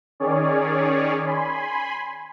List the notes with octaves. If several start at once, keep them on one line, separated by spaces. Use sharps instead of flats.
D#3 C#4 G#4 C#5 D5
G#5 B5 C6